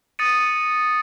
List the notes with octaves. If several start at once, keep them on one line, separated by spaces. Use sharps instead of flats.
D#6 A6 A#6 C#7 D#7